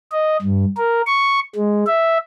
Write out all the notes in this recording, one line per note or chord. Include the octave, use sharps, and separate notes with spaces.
D#5
G2
A#4
C#6
G#3
E5